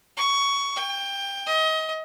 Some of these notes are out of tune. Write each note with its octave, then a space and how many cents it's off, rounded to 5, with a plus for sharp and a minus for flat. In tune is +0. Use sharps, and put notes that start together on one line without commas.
C#6 +15
G5 +20
D#5 +30